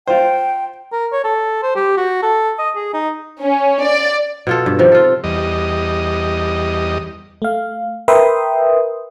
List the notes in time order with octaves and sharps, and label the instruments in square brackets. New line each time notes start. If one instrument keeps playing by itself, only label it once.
[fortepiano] F4 C5 [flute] G5
[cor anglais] A#4
C#5
A4
C5
G4
F#4
A4
D#5
G#4
D#4
[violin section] C#4
D5
[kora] B2 F4 A4
G2
C3 D#3 F3
F4 A4
[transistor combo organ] E2 G3 D#5
[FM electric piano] A3 F5
A#4 B4 E5 G5 C6 D#6